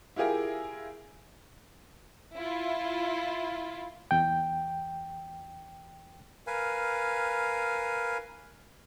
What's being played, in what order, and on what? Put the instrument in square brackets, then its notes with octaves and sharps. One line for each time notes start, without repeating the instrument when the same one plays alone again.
[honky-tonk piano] E4 F4 G4 G#4 A#4
[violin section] E4 F4
[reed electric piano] E2 G5
[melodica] A#4 B4 F5 G#5